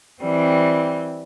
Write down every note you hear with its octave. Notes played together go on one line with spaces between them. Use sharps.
E3 G3 C4